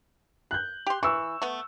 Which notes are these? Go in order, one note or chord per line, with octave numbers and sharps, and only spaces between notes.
F#6 G6
G4 C6
E3 C#6 E6
A3 B3